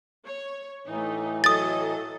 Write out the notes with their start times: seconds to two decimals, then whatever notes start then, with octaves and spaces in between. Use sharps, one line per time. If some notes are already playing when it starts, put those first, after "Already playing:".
0.25 C#5
0.87 A2 E3 A3 D#4
1.44 F#3 A4 D#5 D#6 A6